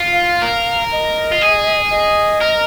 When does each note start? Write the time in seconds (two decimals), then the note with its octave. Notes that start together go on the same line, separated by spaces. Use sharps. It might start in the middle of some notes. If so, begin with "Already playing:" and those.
Already playing: F4
0.13 F5
0.42 A#4
0.92 D#5
1.32 F4
1.42 G#4
1.91 D#5
2.41 A#4